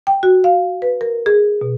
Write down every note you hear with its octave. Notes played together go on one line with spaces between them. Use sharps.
G5
F#4
F5
B4
A#4
G#4
B2